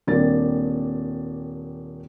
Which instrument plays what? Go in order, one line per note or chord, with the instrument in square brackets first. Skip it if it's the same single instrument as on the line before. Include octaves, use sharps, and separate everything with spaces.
[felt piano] D#1 A#3 C4 D4 A6